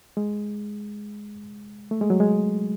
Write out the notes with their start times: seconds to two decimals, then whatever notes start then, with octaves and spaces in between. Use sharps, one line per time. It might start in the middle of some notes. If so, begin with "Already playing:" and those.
0.17 G#3
1.91 A3
2.01 G#3
2.10 F#3
2.20 G#3